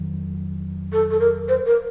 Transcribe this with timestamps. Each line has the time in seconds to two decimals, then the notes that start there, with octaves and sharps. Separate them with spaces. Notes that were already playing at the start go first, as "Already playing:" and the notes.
Already playing: F2 D#3 F#3
0.92 A4
1.10 A4
1.19 A#4
1.48 C5
1.65 A#4